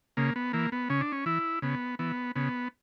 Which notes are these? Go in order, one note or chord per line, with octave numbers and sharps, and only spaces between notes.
C#3 A#3
B3
E3 A#3
B3
C#3 C#4
D4
C#4
E3 E4
C#3 B3
E3 B3
C#3 B3